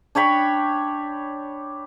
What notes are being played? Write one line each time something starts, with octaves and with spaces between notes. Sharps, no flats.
D4 C#5 G5 B5